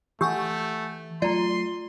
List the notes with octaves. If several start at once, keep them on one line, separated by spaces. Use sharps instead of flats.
E3 A3 G4 F#5 G#5 E6 G6
F#3 A3 F4 D5 A#5 C6